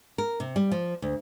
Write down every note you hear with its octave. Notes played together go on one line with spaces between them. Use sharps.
A#4
C3
G3
F3
D2